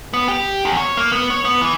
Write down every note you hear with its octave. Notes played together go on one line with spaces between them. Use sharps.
B3
G4
E2
C#5
A#3
B3
C#5
B3
E3